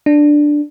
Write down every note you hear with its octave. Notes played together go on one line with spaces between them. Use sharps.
D4